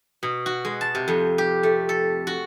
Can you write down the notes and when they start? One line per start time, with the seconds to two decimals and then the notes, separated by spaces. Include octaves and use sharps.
0.23 B2
0.46 F#4
0.65 G#3
0.81 A5
0.95 C3
1.08 F2
1.38 G4
1.63 A3
1.89 A4
2.27 F#4